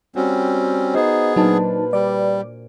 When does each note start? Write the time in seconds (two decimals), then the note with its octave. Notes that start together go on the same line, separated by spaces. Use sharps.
0.16 G3 C4 C#4 F#4
0.95 B3 D#4 G#4 C5
1.36 A#2 F#3 D4 D#4 B4 A5
1.93 G3 D5 D6